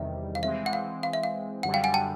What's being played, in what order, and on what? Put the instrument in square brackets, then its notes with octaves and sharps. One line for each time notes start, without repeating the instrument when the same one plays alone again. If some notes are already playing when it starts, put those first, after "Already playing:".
Already playing: [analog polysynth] E2 C3 D#3 G3 [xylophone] E5
[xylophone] F5
[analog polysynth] E3 G#3 C4 [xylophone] E5
[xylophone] F#5
F5
F5
E5
F5
[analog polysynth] F#2 D3 G3 [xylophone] F#5
[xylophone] F5 G5
F#5 G#5
G5 A5